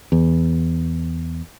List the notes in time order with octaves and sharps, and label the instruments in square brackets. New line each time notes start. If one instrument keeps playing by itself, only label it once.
[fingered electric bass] E2